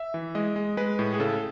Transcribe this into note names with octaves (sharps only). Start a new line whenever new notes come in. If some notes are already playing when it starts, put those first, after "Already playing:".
Already playing: E5
E3
G#3 D#5
G#3
G#3 B4
A2
G#4
C#3 A4